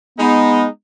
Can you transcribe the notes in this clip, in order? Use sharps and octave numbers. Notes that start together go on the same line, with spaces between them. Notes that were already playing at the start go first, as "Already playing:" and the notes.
G#3 B3 D#4